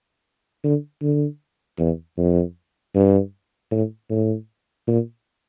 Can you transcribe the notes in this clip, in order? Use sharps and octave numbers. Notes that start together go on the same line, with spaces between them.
D3
D3
E2
F2
G2
A2
A2
A#2